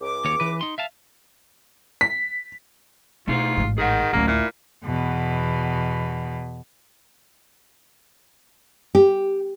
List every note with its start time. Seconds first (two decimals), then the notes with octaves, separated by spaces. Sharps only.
0.01 C#2 D6
0.25 D#2 C#5
0.40 E3 B4
0.61 D#4 C6
0.78 E5 F5 A5
2.01 B6
3.28 B2 A3 D#4 F4 G#4
3.57 A1 G#2
3.78 D#3 G#4 F#5
4.13 A1 D2 C#3 F#3 A#3 C#4
4.27 A#2 E4
4.84 E2 B2
8.95 G4